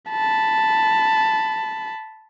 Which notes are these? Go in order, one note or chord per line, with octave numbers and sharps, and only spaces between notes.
A5 B5